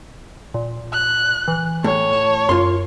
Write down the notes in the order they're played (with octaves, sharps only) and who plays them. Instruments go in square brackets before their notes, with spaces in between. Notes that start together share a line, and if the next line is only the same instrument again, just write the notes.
[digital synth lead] A#2
[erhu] F#6
[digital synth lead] E3
[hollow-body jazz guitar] A2 [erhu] C#5
[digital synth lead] A5
[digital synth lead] F#2 [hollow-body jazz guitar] F4 C6